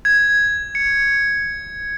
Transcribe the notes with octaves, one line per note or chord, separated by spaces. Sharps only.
G#6
C#7